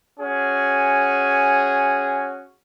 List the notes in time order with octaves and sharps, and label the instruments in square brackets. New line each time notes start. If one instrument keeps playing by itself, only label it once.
[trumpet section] C#4 F#4 G#4